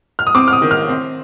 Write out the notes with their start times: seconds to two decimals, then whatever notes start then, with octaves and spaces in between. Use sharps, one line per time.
0.19 F6
0.27 D#6
0.35 C4 D6
0.48 F6
0.53 D#6
0.62 D#3
0.71 F6
0.88 C4